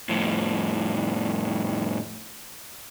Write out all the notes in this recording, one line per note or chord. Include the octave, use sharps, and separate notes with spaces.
F2 A2